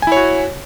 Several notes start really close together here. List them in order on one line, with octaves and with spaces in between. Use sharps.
G#5 E4 C#5 F#4